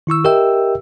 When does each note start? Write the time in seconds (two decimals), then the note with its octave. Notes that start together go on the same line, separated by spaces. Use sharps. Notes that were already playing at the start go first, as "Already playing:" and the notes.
0.07 D#3 E4 C#6 E6
0.24 G4 A#4 D#5 E5 G5 E6